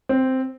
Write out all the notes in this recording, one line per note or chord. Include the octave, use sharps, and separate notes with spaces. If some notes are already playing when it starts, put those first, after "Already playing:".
C4